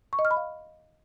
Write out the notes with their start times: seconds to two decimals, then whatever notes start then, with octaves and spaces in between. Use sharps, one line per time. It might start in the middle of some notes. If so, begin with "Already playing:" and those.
0.13 C#6
0.19 D#5
0.25 F6
0.31 B5
0.37 F5